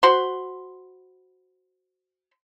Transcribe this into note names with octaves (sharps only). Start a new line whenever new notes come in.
F#4 C5 B5 C6